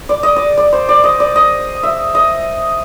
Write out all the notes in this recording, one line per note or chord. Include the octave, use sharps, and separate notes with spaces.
D5
D#5
D5
D5
C5
D5
D#5
D5
D#5
E5
D#5